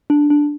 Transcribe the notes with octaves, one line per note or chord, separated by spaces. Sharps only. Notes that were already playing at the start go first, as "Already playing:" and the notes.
D4
D4